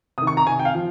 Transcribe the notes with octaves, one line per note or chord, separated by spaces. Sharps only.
C3 D#3 D#6
C#6
A#5
C3 D#3 G#5
G5
F5
F3